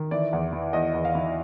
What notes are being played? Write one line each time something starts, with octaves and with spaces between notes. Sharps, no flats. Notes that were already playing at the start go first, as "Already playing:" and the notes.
Already playing: D#3
E3 D5
E2
E3
E2 D#5
E2
F5
E3